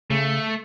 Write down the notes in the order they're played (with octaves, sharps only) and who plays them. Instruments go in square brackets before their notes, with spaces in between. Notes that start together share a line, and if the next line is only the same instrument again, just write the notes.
[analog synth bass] C#3 [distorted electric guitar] A3